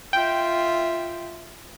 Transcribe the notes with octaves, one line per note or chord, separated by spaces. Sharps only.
F4 E5 G5